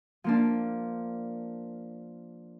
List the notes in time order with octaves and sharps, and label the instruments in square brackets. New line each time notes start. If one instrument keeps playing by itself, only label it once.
[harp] F3 A#3 D4